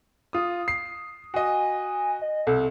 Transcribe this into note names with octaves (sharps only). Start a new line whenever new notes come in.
F4 D#6
C7
F#4 D#5 G#5
D#5
C2 A4